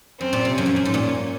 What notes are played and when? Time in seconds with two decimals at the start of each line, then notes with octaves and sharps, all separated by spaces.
0.20 F#2 C4
0.33 A#2
0.45 C3
0.57 F#2 C#4
0.66 F2
0.76 F#2
0.85 G#2
0.94 A#2